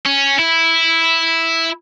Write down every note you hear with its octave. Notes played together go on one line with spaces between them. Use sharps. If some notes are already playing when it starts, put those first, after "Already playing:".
C#4
E4